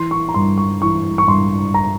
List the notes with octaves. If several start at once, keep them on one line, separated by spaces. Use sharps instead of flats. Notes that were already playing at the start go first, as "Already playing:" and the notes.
Already playing: E3 C6
C#6
A#5
G2 C6
C#6
E3 C#6
C#6
G2 C6
A#5